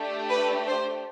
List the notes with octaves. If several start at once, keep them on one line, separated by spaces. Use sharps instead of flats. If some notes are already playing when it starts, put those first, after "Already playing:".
Already playing: A3 D4 G4
B4
C5